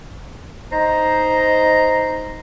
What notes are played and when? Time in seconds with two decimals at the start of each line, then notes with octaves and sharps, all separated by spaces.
0.72 D#4 C5 A#5